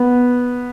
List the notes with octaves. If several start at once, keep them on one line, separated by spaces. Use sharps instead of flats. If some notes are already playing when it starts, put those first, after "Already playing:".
Already playing: B3